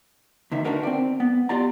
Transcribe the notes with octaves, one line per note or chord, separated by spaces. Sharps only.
D2 D#3 E5
D4 D#4 F#4 A#4 B4
C4 D5
B3
F4 G4 D5 A#5